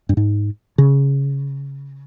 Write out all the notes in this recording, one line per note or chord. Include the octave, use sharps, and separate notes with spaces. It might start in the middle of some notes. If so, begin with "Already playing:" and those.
G2
G#2
C#3